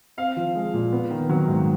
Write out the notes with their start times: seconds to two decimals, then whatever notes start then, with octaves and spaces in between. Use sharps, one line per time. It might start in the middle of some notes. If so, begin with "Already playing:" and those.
0.17 C4 F5
0.36 F3
0.55 G#3
0.74 A#2
0.92 B3
1.11 D#3
1.29 F#3
1.48 G#2